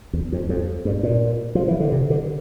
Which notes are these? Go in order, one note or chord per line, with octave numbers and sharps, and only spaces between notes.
E2
F2
F2
G2
A#2
F3
E3
D3
C3
D3